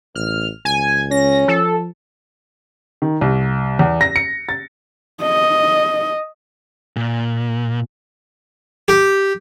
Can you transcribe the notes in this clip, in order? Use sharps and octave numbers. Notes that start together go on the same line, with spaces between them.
A1 F6
C#2 G#5
C#4 A#6
F3 A4
D#3
C2
E2
A#6
C#7
A6
D#5
A#2
G4